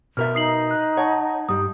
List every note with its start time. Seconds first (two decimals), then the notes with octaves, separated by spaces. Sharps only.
0.17 B2 A#4 E5 F6
0.35 D#4 D#6 C7 F#7
0.71 F#6
0.97 C#5 F#5 A5
1.49 G2 G3 D#6